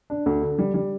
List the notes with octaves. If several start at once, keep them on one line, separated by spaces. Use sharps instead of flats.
D4
D2
D3
G3
G3